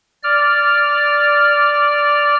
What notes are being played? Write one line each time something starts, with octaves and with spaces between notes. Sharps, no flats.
D5 F6